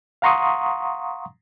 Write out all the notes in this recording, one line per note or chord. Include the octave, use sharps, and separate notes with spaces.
F5 F#5 A#5 C6 C#6 D#6